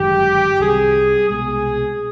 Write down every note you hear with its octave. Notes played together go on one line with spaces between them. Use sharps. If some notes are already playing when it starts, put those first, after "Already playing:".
Already playing: G1 F#2 D#3 G#3 G4
C2 C3 E3 G3 G#4
C2 B2 G#3 G#4